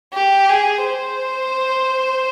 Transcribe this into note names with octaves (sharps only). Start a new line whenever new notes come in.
G4
G#4
C5